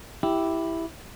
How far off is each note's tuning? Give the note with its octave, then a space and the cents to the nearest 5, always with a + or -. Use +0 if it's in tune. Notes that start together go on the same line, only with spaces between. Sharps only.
E4 +0 G4 +0